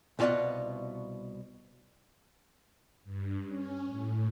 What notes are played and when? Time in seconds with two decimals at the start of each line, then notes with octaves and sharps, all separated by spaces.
0.19 C2 B2 F4 D5 D#5 F#5
3.04 G2
3.46 C#4
3.86 A2